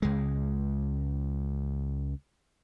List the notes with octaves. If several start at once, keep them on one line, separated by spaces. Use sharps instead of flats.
C#2 G#3